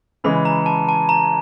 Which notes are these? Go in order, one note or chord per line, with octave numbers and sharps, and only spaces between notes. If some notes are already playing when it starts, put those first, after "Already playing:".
C#3 E3 G#3 B5
A#5
A5
A5
A#5